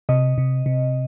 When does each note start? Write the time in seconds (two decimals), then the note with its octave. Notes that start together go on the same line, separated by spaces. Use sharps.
0.09 C3 D#5
0.38 C3
0.66 C3